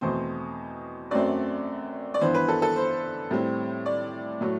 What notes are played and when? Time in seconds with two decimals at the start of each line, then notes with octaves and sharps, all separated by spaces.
0.01 E2 B2 A3 C4 C5
1.11 F#2 F#3 A3 C4 D5
2.14 D5
2.21 G2 E3 B3 C5
2.34 B4
2.48 A4
2.62 A4
2.76 C5
3.31 A2 G3 C4
3.86 D5
4.41 A2 F#3 A3